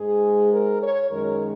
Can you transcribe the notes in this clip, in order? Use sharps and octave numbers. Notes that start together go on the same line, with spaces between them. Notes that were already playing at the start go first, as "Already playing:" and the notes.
Already playing: G#2 G#3 G#4
A#4
C#5
F#2 D#3 G#3 A#4